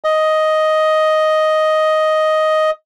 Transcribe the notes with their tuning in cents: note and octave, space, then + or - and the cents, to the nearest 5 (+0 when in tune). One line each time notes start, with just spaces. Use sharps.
D#5 +5